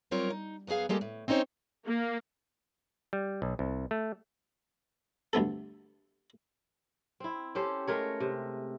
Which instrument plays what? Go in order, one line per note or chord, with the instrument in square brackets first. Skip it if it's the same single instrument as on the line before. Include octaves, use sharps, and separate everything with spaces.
[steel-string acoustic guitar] F#3 G3 C4 F4 A#4 C#5
D#4
F#2 B3 C#4 G#4 F5
G3 G#3 A#3 G4 A4
A2
C4 C#4 D#4 C5 C#5
[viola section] A#3
[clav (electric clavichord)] G3
B1
C2
A3
[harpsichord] D2 G2 B3 A4
[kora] C4 E4
C#4 G4 A4 C5
G#3 A3 A#4 C#5
C3